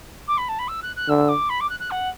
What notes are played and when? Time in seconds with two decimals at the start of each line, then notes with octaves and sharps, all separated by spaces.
0.27 D6
0.37 B5
0.48 A5
0.58 B5
0.68 E6
0.82 F#6
0.96 F#6
1.08 D3 E6
1.28 D6
1.49 B5
1.60 D6
1.69 F#6
1.79 F#6
1.90 F#5